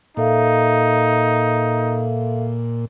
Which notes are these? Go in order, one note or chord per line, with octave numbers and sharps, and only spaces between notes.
A#2 D#4 A4 E5 F5